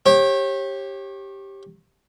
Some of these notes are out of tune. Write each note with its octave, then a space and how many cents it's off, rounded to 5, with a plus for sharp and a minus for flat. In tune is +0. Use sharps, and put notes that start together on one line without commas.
G4 +0 C#5 -35